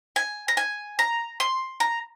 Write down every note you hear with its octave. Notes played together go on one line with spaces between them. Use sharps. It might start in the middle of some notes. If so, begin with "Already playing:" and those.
G#5
A#5
G#5
A#5
C6
A#5